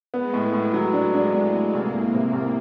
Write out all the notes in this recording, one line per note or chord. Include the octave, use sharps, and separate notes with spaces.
G#3 B3
A2
A2
F#3
D4
D4
A2
A2
C2 A#3
C2
C3
C2